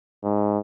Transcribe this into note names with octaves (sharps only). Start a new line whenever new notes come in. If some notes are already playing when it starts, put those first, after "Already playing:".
G#2